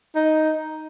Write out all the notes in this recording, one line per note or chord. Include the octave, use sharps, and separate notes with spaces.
D#4